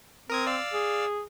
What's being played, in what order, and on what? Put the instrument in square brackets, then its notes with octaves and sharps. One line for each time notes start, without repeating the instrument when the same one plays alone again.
[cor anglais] C4 [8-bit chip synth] A#4 D#6 G#6
[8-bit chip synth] D5 F5 E6
[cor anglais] G#4